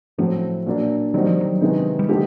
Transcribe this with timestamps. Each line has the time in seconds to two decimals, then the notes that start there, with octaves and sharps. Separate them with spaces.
0.18 A2 F3 F#3 A3 C4
0.66 A#2 F#3 A#3 D4
1.14 D#3 F#3 G3 C4 D#4 F#4
1.27 F3
1.41 F#3
1.61 C3 D#3 G#3 B3 D#4
1.99 G3
2.08 D3 F3 G#3 A#3 D#4 G4